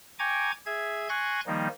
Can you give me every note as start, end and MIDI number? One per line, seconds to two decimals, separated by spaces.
0.19 0.52 79
0.19 0.52 80
0.19 0.52 82
0.19 0.52 85
0.19 0.52 86
0.19 0.52 92
0.66 1.08 68
0.66 1.08 76
0.66 1.08 92
1.09 1.40 80
1.09 1.40 84
1.09 1.40 85
1.09 1.40 90
1.09 1.40 92
1.09 1.40 94
1.47 1.68 51
1.47 1.68 53
1.47 1.68 55
1.47 1.68 58
1.47 1.68 63